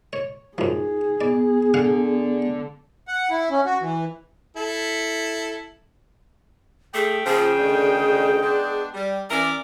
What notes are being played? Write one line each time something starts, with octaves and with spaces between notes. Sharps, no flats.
C#5
F#2 F3 D#4 G#4
B3 D5
D3 F5 F#5
F#5
E4
C#4
F#4
E3
E4 A4
A3 G#4 G5
C#3 F3 A#3 G#4
D2 D3 D#3
G#3 B3 D4
G3
E3 C#4 A#4 D5